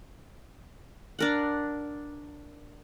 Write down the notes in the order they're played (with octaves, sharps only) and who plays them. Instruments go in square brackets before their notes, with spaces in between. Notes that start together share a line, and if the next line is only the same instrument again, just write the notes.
[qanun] D4 A#4 F#5